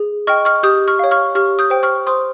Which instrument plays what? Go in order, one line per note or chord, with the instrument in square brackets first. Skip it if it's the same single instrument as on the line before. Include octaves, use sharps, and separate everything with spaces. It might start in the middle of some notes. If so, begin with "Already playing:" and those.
Already playing: [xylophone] G#4
D#5 G5 C#6 F6
C#6 F6
G4 D#6 G6
C#6 F6
C#5 F5
C#6 F6
G4 C#6 F6
D#6 G6
C5 G5
C#6 F6
C5 C6 D#6